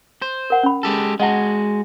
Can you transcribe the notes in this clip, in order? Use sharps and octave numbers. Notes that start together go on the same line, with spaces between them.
C5
A#4 F#5
C#4 B5
G#3 G4 A4
G#3 F#4 D#5 F#5 A5